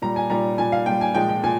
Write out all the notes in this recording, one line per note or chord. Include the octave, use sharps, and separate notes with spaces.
A#2 G3 A#5
G#5
A#2 G3 A#5
A#2 G3 G#5
F5
A#2 G3 G5
G#5
A#2 F3 G#3 G5
G5
A#2 G#5